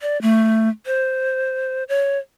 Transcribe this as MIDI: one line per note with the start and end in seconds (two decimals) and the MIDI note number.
0.01 0.20 74
0.22 0.69 57
0.86 1.84 72
1.89 2.18 73